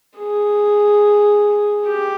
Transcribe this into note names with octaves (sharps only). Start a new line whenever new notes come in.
G#4
G4